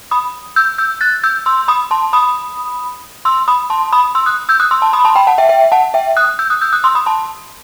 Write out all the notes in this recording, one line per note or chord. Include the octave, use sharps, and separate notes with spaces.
B5 D#6
E6 G6
E6 G6
F#6 A6
E6 G6
C6 E6
B5 D#6
A5 C6
B5 D#6
C6 E6
B5 D#6
A5 C6
B5 D#6
C6 E6
D#6 F#6
E6 G6
D#6 F#6
C6 E6
A5 C6
B5 D#6
A5 C6
G5 B5
F#5 A5
E5 G5
E5 G5
F#5 A5
E5 G5
D#6 F#6
E6 G6
D#6 F#6
E6 G6
D#6 F#6
C6 E6
B5 D#6
A5 C6